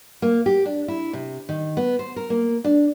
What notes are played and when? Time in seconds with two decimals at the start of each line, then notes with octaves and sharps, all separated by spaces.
0.22 A#3
0.46 G4
0.66 D4
0.88 E4
1.13 C3
1.49 D#3
1.77 B3
1.99 C5
2.16 A#4
2.30 A#3
2.64 D4